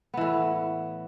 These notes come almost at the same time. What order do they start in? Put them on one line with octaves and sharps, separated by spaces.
B3 E3 A2